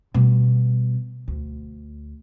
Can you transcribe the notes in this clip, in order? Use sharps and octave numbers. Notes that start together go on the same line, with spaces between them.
B2 G3
D2